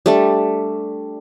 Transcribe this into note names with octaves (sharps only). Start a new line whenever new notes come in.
G3 A3 D4